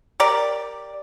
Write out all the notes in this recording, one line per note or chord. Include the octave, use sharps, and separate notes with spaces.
G4 A#4 D5